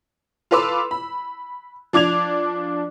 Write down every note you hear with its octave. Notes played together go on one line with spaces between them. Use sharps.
F4 A4 B4 C6 D6 E6
B5
F3 D4 D6 G#6 F7